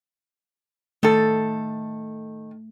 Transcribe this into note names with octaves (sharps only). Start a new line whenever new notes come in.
D#3 A3 A4